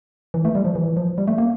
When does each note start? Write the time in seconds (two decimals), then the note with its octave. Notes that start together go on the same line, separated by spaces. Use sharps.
0.34 E3
0.45 A3
0.55 G3
0.65 F3
0.75 E3
0.97 F3
1.18 G3
1.28 A3
1.38 A#3